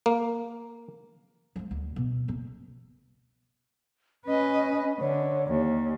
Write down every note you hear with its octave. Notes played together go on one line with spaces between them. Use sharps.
A#3
F3 G#3
D2
B2
F#1 C#4
C#4 B4 D#5
D3 C#5
D#2